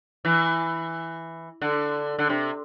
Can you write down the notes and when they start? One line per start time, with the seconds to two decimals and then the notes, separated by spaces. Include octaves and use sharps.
0.25 E3
1.62 D3
2.19 D3
2.29 C3